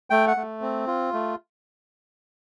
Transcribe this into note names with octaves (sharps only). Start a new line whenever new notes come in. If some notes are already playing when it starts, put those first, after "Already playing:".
A3 G5
F#5
A3
C4
F4
A3